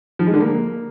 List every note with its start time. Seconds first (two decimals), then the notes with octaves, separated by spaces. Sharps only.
0.19 F3
0.27 G#3
0.34 D3
0.41 A#3